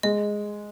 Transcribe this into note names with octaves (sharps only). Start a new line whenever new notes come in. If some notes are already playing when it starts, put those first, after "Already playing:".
G#3 D#5